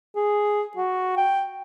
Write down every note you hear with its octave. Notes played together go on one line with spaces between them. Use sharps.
G#4
F#4
G5